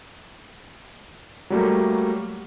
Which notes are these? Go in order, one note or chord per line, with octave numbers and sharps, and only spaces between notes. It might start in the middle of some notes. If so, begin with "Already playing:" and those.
F#3 G3 A3 A#3